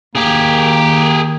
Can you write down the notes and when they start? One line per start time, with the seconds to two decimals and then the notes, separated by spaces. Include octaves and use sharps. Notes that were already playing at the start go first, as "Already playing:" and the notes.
0.15 D#2 D#3 A#3 G4 G#4